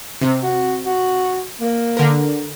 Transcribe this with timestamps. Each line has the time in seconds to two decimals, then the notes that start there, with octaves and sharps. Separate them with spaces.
0.21 C3
0.43 F#4
0.85 F#4
1.61 A#3
1.97 D3 A#4